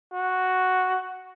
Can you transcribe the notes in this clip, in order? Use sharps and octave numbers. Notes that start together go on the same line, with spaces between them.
F#4